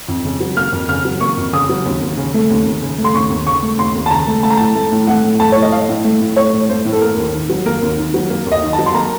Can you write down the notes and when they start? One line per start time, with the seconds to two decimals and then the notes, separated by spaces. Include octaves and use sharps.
0.08 F2
0.25 C#3
0.40 F#3
0.56 A#3 F6
0.72 F2
0.89 C#3 F6
1.05 F#3
1.21 A#3 C#6
1.37 F2
1.53 C#3 D#6
1.69 F#3
1.86 D#2
2.02 D#2
2.17 C#3
2.34 A3
2.50 D#2
2.66 D#2
2.82 C#3
2.98 A3
3.04 C6
3.15 D#2 C#6
3.30 D#2
3.47 C#3 C#6
3.63 A3
3.79 D#2 C6
3.95 D#2
4.06 A5
4.11 C#3 A#5
4.27 A3
4.43 A3 A5
4.50 A#5
4.57 A2 A5
4.75 A3
4.92 A2
5.07 A3 F#5
5.24 A2
5.40 A3 A5
5.52 A2 C#5
5.62 D#5
5.72 A3 F5
5.89 A2
6.05 A3
6.20 A2
6.36 A3 C#5
6.53 A2
6.69 A3 C5
6.85 A2
6.93 A4
7.01 A#3 A#4
7.17 D#2
7.33 D#3
7.50 F#3
7.66 A#3 A#4
7.82 D#2
7.98 D#3
8.14 F#3
8.30 A#3
8.46 D#2
8.52 D#5
8.63 D#3
8.73 A5
8.79 F#3
8.86 C6
8.94 A#3 A#5